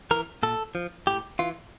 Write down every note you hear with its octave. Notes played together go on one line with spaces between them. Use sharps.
E3 A#4
A#2 A4
F3
A2 G4
E3 F4